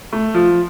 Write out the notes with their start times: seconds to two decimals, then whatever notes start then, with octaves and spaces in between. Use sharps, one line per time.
0.13 A3
0.34 F3